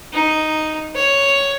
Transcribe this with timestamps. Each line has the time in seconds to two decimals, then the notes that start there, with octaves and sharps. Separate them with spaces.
0.13 D#4
0.95 C#5